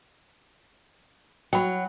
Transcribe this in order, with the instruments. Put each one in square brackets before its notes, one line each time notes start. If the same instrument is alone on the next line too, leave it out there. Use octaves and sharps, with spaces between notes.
[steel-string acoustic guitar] F#3 [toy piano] G5 B5